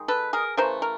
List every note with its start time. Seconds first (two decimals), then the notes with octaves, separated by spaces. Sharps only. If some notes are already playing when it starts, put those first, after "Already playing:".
Already playing: D#3 G#3
0.08 A4 B4
0.33 G#4 A#4
0.57 C#3 E3 A3 A#4 C5
0.82 A#4